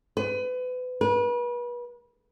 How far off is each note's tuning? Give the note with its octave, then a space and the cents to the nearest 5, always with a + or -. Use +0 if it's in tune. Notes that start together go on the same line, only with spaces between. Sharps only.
B4 +30
B4 -35